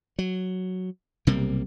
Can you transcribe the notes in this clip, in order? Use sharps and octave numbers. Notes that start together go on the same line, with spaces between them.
F#3
B1 C3 G3 A#3